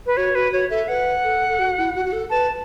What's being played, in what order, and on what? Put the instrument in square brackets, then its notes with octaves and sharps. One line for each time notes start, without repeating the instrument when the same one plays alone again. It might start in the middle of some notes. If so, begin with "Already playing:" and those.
[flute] B4
[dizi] F#4 [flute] C#5
[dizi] F#4 [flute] B4
[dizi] F#4 [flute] C#5
[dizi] A4 [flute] E5
[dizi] B4 [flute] F#5
[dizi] A4
A4
F#4
E4
F#4
F#4
A4
[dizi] B4 [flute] A5